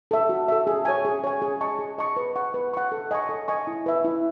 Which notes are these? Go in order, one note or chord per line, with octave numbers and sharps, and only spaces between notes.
A4 E5
F#4
A4 E5
G#4
C#5 G#5
G#4
C#5 G#5
G#4
D#5 A5 C#6
G#4
D#5 A5 C#6
B4
F#5 C#6
B4
F#5 C#6
A4
D#5 G#5 C#6
A4
D#5 G#5 C#6
E4
B4 E5
E4